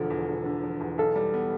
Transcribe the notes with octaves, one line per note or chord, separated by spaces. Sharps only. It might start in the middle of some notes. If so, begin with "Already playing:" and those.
Already playing: E1 D3 F3 A4
E2
E1
D3
F3
E2
B1 A4
G3
B3